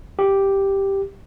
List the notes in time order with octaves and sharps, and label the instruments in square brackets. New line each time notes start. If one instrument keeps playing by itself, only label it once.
[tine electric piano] G4